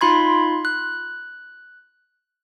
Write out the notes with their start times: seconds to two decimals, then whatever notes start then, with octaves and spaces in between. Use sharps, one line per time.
0.01 D#4 F4 B5 C6 G#6
0.65 F#6